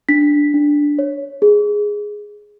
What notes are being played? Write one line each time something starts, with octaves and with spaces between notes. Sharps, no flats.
D4 B6
D4
C#5
G#4